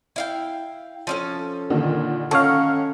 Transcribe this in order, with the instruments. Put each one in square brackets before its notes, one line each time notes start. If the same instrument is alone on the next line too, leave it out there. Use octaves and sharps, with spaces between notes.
[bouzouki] E4 F5 G5
F3 C#4 A4
[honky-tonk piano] A#2 D3 D#3
[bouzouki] D#3 [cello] C#4 [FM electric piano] A4 C#5 F5 [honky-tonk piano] F#5